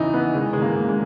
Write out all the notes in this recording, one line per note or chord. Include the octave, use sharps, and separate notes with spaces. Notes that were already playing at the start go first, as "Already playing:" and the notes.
Already playing: E2 C#3 E3 D#4 E4
E3 B3
D#3 G#3
D#3 G#3
A#3
G#2
G#3